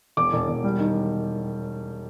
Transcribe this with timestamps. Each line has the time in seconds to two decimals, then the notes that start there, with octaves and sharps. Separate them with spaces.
0.17 E1 D6
0.33 E1
0.48 E1
0.64 G3
0.79 D#3